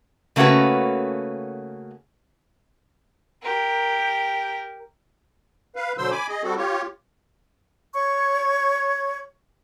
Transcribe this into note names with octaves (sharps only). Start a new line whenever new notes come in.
C#3 A3 A#3 C#4 F#4 B4
G4 A#4
B4 F5
B2 D3 F#3 C5 C6 E6
G#5 B5 D6
G#4 D#5
G3 C4 F#4 A4
F4 G4 C#5
C#5 C#6 G#6